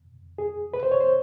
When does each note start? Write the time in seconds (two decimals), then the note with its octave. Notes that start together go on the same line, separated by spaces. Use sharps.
0.38 G#4
0.74 B4
0.83 C5
0.92 C#5
1.01 C5